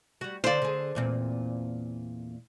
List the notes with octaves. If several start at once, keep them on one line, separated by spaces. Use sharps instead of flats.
G3 F#4
D3 C5 D5 F5
D3 G#4
E2 A#2 C4